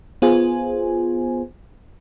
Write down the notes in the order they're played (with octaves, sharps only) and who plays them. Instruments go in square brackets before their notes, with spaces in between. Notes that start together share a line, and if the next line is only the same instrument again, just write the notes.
[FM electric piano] B3 F4 G#4 C5 G#5